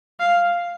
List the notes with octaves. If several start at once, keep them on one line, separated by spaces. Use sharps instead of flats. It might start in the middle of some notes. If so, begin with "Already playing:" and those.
F5